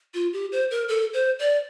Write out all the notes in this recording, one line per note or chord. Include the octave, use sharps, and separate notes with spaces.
F4
G4
C5
A#4
A4
C5
D5